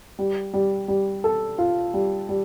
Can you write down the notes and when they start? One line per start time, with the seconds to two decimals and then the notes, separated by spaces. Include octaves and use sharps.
0.19 G3
0.53 G3
0.88 G3
1.24 A4
1.58 F4
1.94 G3
2.29 G3